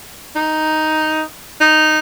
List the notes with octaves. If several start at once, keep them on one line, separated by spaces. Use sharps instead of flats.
D#4
D#4